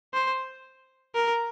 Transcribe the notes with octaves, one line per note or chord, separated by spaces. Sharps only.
C5
A#4